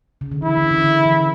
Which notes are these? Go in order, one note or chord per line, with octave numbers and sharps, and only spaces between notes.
C#3
D3
E3 E4
D3
C#3
D3
E3